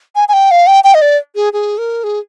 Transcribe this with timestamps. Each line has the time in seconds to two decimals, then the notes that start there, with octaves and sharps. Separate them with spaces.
0.16 G#5
0.28 G#5
0.33 G5
0.51 F5
0.67 G5
0.84 G5
0.94 D#5
1.01 D5
1.35 G#4
1.53 G#4
1.78 A#4
2.04 G#4